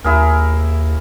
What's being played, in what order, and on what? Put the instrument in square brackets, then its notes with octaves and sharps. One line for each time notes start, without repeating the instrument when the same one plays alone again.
[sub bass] D#2 [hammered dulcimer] E4 G#4 A#4